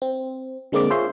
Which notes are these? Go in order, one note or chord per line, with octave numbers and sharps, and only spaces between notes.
C4
D3 G#3 A#3 C4 D5 D6
F4 G#4 C5 C#5 E5 C6